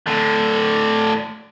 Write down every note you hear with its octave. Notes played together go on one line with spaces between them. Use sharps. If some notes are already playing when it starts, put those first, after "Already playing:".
A2 D3